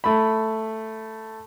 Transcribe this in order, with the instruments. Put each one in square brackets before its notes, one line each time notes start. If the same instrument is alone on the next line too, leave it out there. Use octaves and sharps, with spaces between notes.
[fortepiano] A3 B5